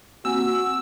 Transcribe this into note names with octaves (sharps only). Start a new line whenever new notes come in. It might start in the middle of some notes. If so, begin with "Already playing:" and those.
A#3 C4 F#4 G#5 E6